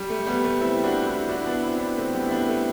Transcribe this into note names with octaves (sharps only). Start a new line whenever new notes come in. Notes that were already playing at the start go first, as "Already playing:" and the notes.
Already playing: G3
A3
G3 B3
A3
C4 E4
D4 F#4
E4 G4
D4 F#4
E4
B3 D4
C4 E4
E4
B3 D4
A3 C4
G3 B3
E4
B3 D4
A3